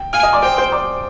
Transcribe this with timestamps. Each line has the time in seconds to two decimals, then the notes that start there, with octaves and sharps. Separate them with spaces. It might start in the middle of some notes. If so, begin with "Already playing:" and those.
Already playing: G5
0.13 F5 G#5 F6
0.23 D#5 D#6
0.33 D5 D6
0.42 C5 G5 C6
0.57 C5 C6
0.72 D5 D6